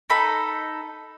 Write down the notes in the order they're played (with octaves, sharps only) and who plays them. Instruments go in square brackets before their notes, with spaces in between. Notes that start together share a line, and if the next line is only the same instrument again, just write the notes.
[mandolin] D#4 A4 B5